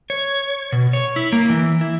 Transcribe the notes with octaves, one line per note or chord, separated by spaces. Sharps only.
C#5
B2
C#5
E4
A#3
E3
E4